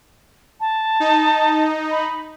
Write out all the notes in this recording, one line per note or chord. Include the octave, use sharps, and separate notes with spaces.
A5
D#4
B5